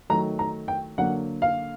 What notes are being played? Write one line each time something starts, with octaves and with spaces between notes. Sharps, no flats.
D#3 F#3 A3 A#5
A#5
G5
D3 F#3 A#3 F#5
F5